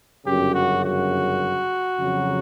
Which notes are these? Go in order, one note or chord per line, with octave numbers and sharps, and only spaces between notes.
G1 F#2 C#3 G4
F#4
F#4
F2 C#3 F#3